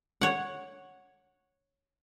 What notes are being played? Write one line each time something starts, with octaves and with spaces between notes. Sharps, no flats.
C#5 F#5